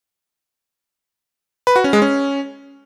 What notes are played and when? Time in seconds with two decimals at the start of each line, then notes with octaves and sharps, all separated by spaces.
1.67 B4
1.76 F#4
1.84 C#4
1.93 G#3
2.02 C#4